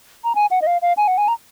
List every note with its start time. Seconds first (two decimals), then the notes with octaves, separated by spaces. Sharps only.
0.24 A#5
0.35 G#5
0.51 F#5
0.62 D#5
0.67 F5
0.82 F5
0.97 G#5
1.08 F#5
1.18 G#5
1.28 A#5